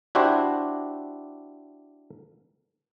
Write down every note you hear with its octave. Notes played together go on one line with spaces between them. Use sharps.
D4 E4 F#4 G4 C5